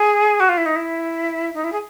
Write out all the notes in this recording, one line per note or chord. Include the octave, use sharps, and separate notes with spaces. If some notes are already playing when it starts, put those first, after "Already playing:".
Already playing: G#4
F#4
F4
E4
D#4
E4
D#4
E4
G#4